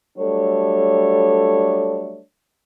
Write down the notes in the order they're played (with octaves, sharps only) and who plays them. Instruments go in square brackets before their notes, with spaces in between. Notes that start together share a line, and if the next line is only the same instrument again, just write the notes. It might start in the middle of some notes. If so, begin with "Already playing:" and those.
[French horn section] F#3 G3 A3 D4 A4 C#5